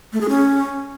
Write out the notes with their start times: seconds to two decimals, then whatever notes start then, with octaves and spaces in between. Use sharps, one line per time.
0.13 A3
0.21 G#4
0.29 C#4